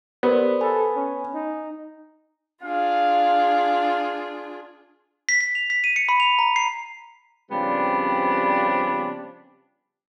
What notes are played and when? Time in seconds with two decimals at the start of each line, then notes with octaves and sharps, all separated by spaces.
0.23 B3 G4 A#4 C5 D5
0.61 A4 G#5 B5
0.96 C#4
1.34 D#4
2.63 D4 F4 G#4 F5
5.29 B6
5.41 B6
5.55 F7
5.70 B6
5.84 D#7
5.96 C#7
6.09 B5
6.20 F7
6.39 A#5
6.56 C7
7.51 C#3 F3 G3 B3 C4 D4